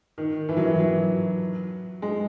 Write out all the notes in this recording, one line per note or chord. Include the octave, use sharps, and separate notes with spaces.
D#3
E3
F#3
E3
F#3
G#3